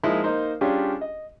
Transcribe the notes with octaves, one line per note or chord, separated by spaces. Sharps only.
F3 G#3 A#3 D#4 E4
A#3 D#4 C5
G3 C#4 D4 F4 G4 G#4
D#5